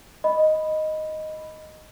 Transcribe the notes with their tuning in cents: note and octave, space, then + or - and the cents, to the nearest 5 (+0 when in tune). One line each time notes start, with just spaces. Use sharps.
D#5 +0 B5 +0